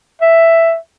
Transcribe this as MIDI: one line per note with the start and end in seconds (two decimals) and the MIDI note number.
0.21 0.76 76